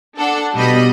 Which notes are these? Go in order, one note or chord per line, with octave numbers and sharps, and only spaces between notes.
D4 A4 F#5
B2 G3 D#5 B5